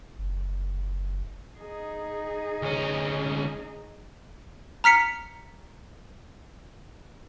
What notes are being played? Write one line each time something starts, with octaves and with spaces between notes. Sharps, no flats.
F#1
D#4 G#4
D2 C#4
A#5 F6 B6 C#7